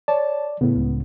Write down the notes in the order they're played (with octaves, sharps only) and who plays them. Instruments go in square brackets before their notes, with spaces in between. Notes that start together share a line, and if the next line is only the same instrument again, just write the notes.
[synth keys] C#5 A5 [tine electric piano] D5
[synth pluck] A2 C#3 [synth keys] B3
[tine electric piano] C#2